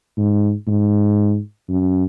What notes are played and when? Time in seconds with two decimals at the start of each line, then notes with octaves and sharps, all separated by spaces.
0.17 G#2
0.67 G#2
1.69 F#2